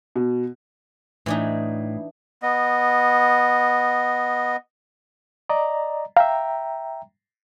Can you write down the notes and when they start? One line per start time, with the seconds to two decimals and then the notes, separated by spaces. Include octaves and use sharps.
0.16 B2
1.26 A2 E3 D4 D#4
2.43 B3 D#5
5.49 D5 D#5 A#5
6.17 E5 F5 G5 A#5